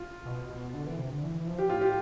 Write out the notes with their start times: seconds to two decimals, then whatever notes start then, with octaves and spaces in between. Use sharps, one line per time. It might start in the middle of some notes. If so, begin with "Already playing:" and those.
Already playing: F4
0.25 B2
0.49 B2
0.74 D3
0.87 E3
0.98 C3
1.11 D3
1.23 E3
1.40 E3
1.47 F3
1.58 G4
1.70 A2 F4
1.81 G4